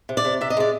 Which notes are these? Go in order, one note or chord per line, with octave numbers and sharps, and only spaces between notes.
C3
D5
C3
C3 E5
D#5
G#3 D5